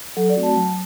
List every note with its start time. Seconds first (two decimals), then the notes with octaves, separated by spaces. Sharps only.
0.17 F#3 A4
0.30 D5
0.36 A3 C4 F#4
0.43 A5
0.55 F#3